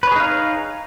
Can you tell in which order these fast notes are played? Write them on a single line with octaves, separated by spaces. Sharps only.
B4 C#5 G#4 D#4 F5